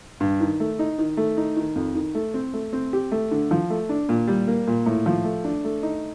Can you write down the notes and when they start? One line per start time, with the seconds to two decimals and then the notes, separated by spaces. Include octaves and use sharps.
0.20 G2
0.41 D#3
0.60 A3
0.79 D#4
0.99 D#3
1.17 A3
1.37 D#4
1.57 D#3
1.76 F2
1.95 D#3
2.15 A3
2.34 C4
2.54 A3
2.73 C4
2.93 G4
3.12 A3
3.31 D3
3.51 F3
3.70 A3
3.89 D4
4.09 A#2
4.28 G3
4.48 A#3
4.67 A#2
4.86 A2
5.06 F3
5.25 A3
5.44 D4
5.64 A3
5.83 D#4